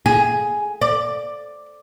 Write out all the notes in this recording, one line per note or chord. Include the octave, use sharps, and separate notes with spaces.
G#4
D5